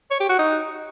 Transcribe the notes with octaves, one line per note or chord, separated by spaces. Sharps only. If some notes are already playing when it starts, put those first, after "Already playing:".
C#5
G4
F#4
D#4